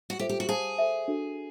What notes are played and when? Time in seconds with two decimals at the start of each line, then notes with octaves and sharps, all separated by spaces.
0.10 F#4
0.19 F4 G4 A4 C5 E5
0.29 G4
0.40 F#4
0.49 G#4 C5 F5 A5
0.79 A4 C5 E5
1.08 D4 F#4 A4